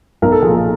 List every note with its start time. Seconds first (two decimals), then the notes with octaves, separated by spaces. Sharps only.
0.22 B1 A#4
0.32 A4
0.42 F3 G#4
0.48 A#2
0.54 A4